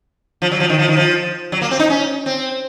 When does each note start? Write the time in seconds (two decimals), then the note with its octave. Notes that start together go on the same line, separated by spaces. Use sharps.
0.42 F3
0.51 F#3
0.60 F3
0.70 D#3
0.79 F3
0.88 D#3
0.97 F3
1.52 F#3
1.61 A#3
1.71 C4
1.79 D#4
1.90 C#4
2.26 C4